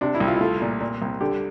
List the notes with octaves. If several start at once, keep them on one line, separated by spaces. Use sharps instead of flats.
C3 D4
E4
C2
F4
E4
A3 F4
A#2
A#2
C2
D3 G4